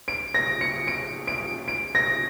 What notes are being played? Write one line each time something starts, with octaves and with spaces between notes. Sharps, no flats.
D7
A#6
C#7
D7
D7
D7
A#6